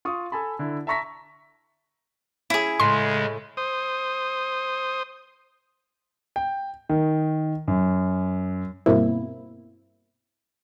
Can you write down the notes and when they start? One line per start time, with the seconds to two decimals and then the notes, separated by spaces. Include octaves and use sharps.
0.05 F4 C#6 D#6
0.32 A4 G#5 A5 B5
0.59 D3 E4
0.87 E5 A5 A#5 C#6 A#6 B6
2.50 C#4 E4 G#4
2.80 A2 C#3 G#3 A3 C6
3.57 C5 D#6
6.36 G5
6.89 D#3
7.68 F#2
8.86 G2 B2 A#3 C4 E4